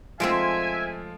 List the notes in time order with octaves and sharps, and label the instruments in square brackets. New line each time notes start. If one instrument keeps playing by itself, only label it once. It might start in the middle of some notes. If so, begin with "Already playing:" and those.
[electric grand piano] F3 F4 D7 [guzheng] G#3 A3 C4 [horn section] E5 G#5